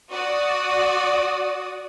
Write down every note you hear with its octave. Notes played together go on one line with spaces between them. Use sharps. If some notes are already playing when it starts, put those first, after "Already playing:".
F#4 D5 D#6